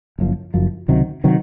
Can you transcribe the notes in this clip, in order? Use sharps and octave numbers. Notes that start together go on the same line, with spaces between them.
F#1 F#2 F3
F#1 F#2 F3
C#2 C3 D#3 F#3
C3 D#3 F#3